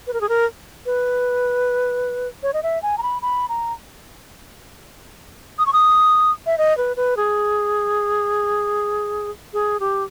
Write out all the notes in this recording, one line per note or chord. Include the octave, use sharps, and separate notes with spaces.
B4
A#4
G#4
A#4
B4
C#5
D#5
E5
G#5
A#5
B5
B5
A#5
D#6
C#6
D#6
E5
D#5
B4
B4
G#4
G#4
G4